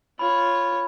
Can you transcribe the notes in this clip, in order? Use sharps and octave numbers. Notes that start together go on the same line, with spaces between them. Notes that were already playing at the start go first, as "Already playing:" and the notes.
F4 C#5 B5